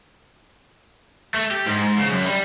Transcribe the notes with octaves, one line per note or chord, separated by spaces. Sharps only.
A3
G4
G#2
C#3
F#2
G3